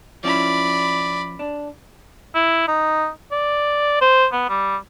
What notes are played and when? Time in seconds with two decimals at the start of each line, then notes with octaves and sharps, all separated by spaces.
0.23 F3 C#4 E4 D5 B5
1.39 D4
2.35 E4
2.68 D#4
3.32 D5
4.01 C5
4.33 B3
4.49 G3